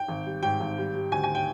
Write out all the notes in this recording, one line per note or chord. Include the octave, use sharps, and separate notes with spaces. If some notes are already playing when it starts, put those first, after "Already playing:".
Already playing: G5
G#1
G3
G#2 G5
G#1
G3
G3
D2 G#5
G#5
G5